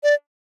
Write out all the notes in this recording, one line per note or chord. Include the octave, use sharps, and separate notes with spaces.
D5